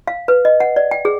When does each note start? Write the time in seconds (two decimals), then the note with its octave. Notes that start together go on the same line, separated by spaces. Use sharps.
0.07 F5
0.28 B4
0.45 D#5
0.60 F#5
0.76 D5
0.91 G5
1.05 G#4